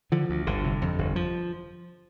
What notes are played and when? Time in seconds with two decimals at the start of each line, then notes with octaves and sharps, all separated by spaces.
0.12 D3 F3
0.29 D2
0.47 G1 D3
0.64 C3
0.82 F2
0.99 G1
1.16 F3